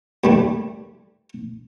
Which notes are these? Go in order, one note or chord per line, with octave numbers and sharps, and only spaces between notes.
D#2 G3 A3